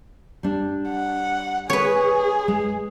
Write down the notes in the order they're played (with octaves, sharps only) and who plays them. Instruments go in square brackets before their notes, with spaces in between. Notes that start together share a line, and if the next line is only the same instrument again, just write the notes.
[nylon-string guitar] G3 D4
[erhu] F#5
[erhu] G#4 [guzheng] B4 C#5
[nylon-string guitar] G#3